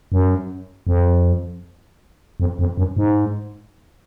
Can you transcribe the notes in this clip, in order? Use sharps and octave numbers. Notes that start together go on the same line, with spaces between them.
F#2
F2
F2
F2
F#2
G#2